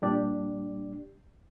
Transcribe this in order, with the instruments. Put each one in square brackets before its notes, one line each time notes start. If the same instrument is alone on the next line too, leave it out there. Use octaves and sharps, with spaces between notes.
[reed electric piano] A#2 G3 D4 G4 D5